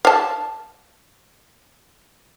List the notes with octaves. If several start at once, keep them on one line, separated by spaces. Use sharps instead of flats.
F5 A5